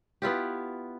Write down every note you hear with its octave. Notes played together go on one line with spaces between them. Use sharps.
B3 E4 F4 G4